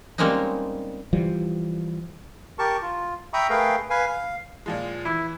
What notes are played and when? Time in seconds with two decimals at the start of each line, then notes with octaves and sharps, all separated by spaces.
0.18 G3 G#3 A#3 C4 C#4 D#4
1.13 E3 F3 G3
2.59 G4 A#4 A5 C#6
2.82 F4
3.33 E5 G5 A#5 B5 C#6 D#6
3.50 A3 G#4 A#4 B4 F5 G5
3.90 B4 F5 G#5
4.07 F5
4.66 A#2 F3 G#3
5.05 E3 E4